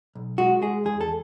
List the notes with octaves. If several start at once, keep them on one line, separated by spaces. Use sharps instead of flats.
B1
G#3 F#4
G#3 G#4
E2 G#4
A4